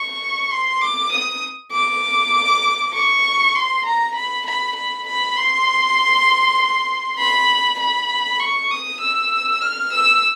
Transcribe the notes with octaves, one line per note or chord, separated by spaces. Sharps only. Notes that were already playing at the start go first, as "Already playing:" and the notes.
Already playing: C#6
C6
D6
D#6
D6
C#6
C6
A#5
B5
B5
B5
B5
C6
B5
B5
C#6
D#6
E6
F6
E6